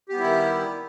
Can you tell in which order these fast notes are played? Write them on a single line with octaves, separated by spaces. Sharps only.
G4 B3 G3 E4 D#3